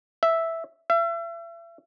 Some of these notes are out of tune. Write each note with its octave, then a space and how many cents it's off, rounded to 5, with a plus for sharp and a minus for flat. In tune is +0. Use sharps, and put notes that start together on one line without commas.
E5 +0
E5 +40